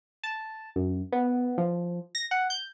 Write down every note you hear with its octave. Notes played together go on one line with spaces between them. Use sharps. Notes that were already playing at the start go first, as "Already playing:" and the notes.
A5
F#2
B3
F3
A#6
F#5
G6